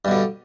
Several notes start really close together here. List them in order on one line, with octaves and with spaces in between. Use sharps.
G2 B2 D3